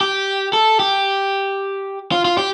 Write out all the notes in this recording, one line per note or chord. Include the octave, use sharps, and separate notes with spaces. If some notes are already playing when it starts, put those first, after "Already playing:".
G4
A4
G4
F4
F4
G4